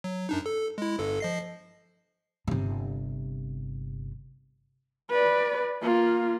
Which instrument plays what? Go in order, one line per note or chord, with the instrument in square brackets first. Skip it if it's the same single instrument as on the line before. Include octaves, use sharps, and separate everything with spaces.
[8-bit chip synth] F#3
F#2 D4 D#4
A4
G#3 E4
G1 G2 A4
F3 D#5 C7
[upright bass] G1 C3
[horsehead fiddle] B4 D5
A#3 F4